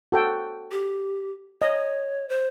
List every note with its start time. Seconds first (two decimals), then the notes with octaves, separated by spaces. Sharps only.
0.12 F#4 A4 G5
0.71 G4
1.62 C#5 D#5
2.29 C5